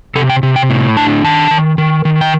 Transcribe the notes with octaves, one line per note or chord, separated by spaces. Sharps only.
C3 A4
G5
C3
G5
A2
D4 A5
D#3 A5
D#3
D#3
D#3
G5